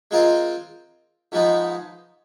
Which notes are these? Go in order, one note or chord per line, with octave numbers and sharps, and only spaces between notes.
G#3 C4 F4 A#4 D#5
G#2 F3 G#3 B3 D#4